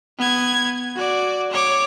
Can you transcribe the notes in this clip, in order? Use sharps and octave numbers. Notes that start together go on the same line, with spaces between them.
B3 G#6
F#4 D5
C#5 D6